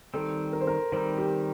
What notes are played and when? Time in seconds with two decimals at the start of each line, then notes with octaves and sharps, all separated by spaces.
0.14 D#3 G3 C4 A4
0.53 A#4
0.61 C5
0.67 A#4
0.92 D#3 G3 C4 C5
1.18 G4